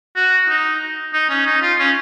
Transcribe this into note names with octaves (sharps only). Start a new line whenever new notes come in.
F#4
D#4
D#4
C#4
D#4
F4
C#4